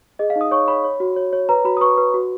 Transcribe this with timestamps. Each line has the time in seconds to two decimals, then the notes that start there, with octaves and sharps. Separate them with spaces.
0.19 G#4 D#5
0.30 F5
0.36 D#4
0.41 D#6
0.51 C#5 C#6
0.68 C#5 B5
0.84 C#5
1.00 F#4
1.16 C#5
1.33 C#5
1.49 B4 A#5
1.65 F#4 B5
1.77 D#6
1.81 B4 C#6
1.98 B4
2.14 F#4